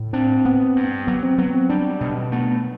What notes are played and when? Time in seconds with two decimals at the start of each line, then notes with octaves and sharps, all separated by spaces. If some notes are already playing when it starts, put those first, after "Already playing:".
Already playing: A2
0.13 C4 D4
0.45 B3
0.76 G2
1.07 F#3 B3
1.23 C4
1.38 F#3 B3
1.54 C4
1.69 G3 D4
2.01 B2
2.32 A3 B3